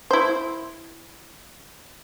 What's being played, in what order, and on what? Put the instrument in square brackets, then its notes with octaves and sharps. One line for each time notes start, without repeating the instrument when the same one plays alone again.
[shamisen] E4 C5